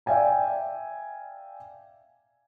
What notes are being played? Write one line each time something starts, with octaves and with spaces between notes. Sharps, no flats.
D5 E5 F5 G5 G#5 A#5